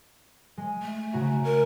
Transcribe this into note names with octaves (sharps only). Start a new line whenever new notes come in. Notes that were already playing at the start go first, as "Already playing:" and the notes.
G#3
A3
C#3 F#4 A#5
A#4